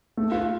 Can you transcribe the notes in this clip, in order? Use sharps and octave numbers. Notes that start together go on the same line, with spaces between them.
A3
F4